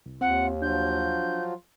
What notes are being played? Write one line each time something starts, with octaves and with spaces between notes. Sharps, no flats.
C2
D#2 C4 F4 F#5
F3 F#3 D4 F4 G6